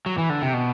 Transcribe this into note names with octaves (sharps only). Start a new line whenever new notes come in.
F#3
E3
D3
C3
B2